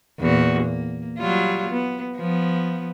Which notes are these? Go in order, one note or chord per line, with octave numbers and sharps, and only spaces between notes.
E2 A#2 F#4
A#3
F#3 G3 F4
B3
F3 B3